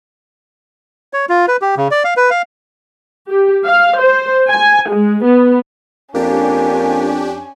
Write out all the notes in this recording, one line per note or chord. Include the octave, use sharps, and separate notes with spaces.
C#5
F4
B4
G4
C#3
D5
F5
B4
F5
G4
F5
C5
G#5
G#3
B3
F2 A#3 C#4 D4 G4 G#5